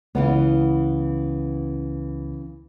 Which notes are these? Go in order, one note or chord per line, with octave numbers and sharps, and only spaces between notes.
C#2 C#3 E3 B3